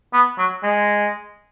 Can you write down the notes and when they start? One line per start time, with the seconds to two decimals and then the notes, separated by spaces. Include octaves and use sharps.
0.14 B3
0.39 F#3
0.63 G#3